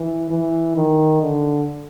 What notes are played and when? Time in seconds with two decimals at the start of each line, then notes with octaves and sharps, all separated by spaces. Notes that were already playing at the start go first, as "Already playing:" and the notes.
Already playing: E3
0.30 E3
0.76 D#3
1.22 D3